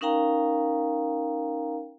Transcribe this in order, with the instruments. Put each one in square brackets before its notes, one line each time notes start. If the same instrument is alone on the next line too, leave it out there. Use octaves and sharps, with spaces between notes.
[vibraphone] C#4 D#4 A#4 F5 G5 A#5